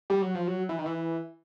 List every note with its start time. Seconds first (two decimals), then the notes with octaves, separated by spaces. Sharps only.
0.10 G3
0.22 F#3
0.35 F3
0.47 F#3
0.69 E3
0.78 D#3
0.86 E3